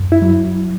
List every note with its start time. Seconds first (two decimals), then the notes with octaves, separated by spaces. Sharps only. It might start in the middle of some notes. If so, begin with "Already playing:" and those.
Already playing: F#2
0.12 E4
0.22 F#3